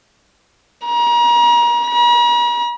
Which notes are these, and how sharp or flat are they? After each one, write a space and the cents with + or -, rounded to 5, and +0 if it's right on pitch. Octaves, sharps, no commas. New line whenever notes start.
A#5 +35
A#5 +45